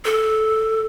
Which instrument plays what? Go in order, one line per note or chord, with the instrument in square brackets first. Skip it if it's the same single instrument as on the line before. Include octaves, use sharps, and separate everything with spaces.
[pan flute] A4